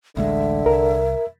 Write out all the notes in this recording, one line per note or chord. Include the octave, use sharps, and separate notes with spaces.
A1 D2 D3 G#3 E5
C2 A#4